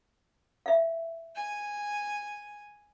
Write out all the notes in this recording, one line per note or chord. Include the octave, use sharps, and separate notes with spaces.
E5 F5
G#5